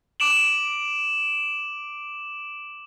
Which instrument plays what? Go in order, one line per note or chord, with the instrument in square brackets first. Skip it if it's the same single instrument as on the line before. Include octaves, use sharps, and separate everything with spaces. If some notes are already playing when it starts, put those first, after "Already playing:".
[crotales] D6 D7 E7 F#7